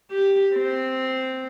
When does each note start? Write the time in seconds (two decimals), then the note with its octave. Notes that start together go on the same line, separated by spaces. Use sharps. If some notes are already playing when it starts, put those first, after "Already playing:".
0.11 G4
0.55 C4